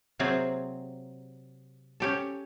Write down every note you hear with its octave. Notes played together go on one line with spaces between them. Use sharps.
C3 F#3 A#3 C4 F4 G#4
C#4 G4 A4